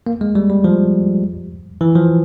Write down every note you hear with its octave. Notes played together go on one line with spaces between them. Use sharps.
A#3
G#3
G3
G3
F3
E3
F3